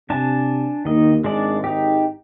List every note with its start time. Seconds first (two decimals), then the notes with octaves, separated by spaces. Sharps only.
0.10 C3 D4 G#5 A5
0.85 D#2 D#3 D#5
1.24 G#1 G#3 D4 D5
1.64 D#4 G4